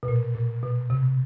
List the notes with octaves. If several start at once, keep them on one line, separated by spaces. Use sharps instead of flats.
B2
A#2
A#2
B2
C3